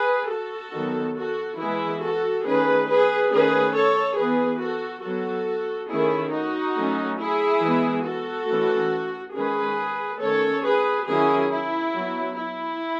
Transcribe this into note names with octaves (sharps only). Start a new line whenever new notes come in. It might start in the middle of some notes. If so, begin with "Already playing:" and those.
Already playing: G#4 B4
F#4 A4
D#3 F#3 B3
F#4 A4
E3 G#3 B3 E4 G#4
F#4 A4
D#3 A3 C#4 G#4 B4
G#4 B4
D#3 A3 C#4 G#4 B4
A4 C#5
E3 B3 G#4 B4
F#4 A4
F#3 B3 F#4 A4
D#3 A3 C#4 E4 G#4
D#4 F#4
F#3 A3 C#4
E4 G#4
E3 G#3 B3
F#4 A4
E3 A3 C#4
D#3 G#3 C#4 G#4 B4
D#3 A3 C#4 A4 C#5
G#4 B4
D#3 F#3 C#4 E4 G#4
E4
F#3 B3
E4